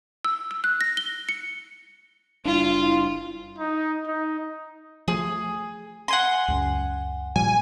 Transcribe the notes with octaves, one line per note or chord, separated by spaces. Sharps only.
E6
E6
F#6
A#6
G7
C#7
F#1 G3 D4 E4 F4
D#4
D#4
F3 A3 G#4
F#5 G#5 C6
C#2 F#2
A#2 F3 G3 G#5